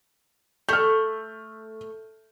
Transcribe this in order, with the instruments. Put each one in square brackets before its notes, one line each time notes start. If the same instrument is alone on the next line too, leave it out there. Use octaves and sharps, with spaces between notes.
[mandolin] A3 [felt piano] F6 G6